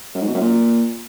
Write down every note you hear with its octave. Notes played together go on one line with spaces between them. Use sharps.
F#2
G#2
B2
F#2
A#2